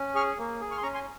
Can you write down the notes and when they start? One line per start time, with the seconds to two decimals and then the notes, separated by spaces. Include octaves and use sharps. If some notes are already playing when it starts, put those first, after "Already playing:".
Already playing: C#4
0.15 G#4 C#6 F6
0.38 A#3
0.60 G#4
0.71 C#6 F6
0.77 C6
0.82 C#4 A#5 C#6
0.94 G#5 C6